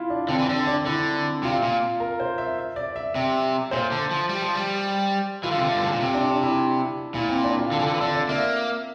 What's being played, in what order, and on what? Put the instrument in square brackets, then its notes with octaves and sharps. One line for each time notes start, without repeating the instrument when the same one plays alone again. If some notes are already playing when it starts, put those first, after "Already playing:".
Already playing: [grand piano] E4 F4
D4
[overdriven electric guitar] D3 [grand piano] C4
[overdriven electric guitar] E3
[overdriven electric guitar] D3 [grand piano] D4
[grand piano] D4
[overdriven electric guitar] D3 [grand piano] E4
[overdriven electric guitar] C3 [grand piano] F4
[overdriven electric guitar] A#2
[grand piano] A#4
C5
E5
E5
D5
E5
[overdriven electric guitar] C3 [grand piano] E5
[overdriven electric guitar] A#2 [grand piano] C5
[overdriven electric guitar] D3
F3
G3
F3
G3
[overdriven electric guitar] E3 [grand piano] F4
[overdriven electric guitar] D3
C3
D3
G2
A2
A#2
C3
[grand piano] D4
D4
E4
[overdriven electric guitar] A#2 [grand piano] E4
[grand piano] C4
D4
F4
[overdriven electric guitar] D3 [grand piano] A4
[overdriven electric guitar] E3
D3
E3
[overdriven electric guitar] D3 [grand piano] D5
[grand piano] D5
[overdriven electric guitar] A#3 [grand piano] E5